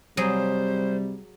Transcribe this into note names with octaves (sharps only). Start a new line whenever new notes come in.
C3 F#3 G3 G#4 C5